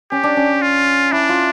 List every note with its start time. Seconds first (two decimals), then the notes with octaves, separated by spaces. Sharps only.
0.11 C#4 G4
0.24 D4
0.37 C#4
0.62 F4
1.12 D4 E4
1.29 F4